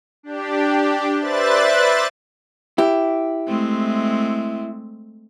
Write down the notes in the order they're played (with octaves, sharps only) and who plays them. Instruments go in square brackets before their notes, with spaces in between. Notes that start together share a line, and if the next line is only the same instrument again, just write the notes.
[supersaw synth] D4 G4
B4 C5 D5 E5 F#6 A6
[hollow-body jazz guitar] E4 G4
[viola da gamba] G#3 A3 C4